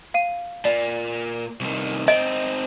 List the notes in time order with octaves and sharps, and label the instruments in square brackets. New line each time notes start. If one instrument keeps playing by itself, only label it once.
[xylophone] F5 D#7
[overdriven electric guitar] A#2 [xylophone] D5
[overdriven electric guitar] C2 D#3
[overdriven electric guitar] C4 D#4 [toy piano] D#5 [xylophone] D7